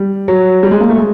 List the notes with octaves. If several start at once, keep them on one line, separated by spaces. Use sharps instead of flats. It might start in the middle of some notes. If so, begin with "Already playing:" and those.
Already playing: G3
F#3
G3
G#3
A#3
A3
G#3